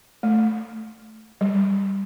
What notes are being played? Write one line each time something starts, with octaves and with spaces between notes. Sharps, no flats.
A3
G3